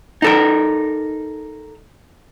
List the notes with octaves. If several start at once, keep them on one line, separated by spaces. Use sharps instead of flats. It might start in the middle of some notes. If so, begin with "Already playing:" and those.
D#4 A4 A#4